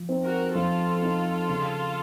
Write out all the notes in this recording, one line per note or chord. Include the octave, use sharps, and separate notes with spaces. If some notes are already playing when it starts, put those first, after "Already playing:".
Already playing: F3
C4 D#4
F#4 A#4
F3 F4 A4
C4 D#4
C#3